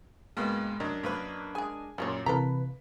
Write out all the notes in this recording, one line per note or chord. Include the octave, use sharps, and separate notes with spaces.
G2 B2 G#3 A#3 B4
F#2 D4 A#4 D#5
F#2 A#3 B4
G#3 G#4 G#5
F#2 A#2 G3 F4 C#5
C3 E3 A#3 A4 B4 A#5 B6